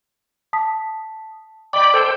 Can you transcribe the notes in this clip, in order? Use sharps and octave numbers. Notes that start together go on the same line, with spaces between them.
A5 D#6 B6
D5 D#5 G5 B5 D6
A4 C5 G5